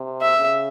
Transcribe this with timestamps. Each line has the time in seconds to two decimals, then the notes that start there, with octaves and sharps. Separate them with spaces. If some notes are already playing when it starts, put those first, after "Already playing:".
Already playing: C3
0.22 E5
0.37 C#3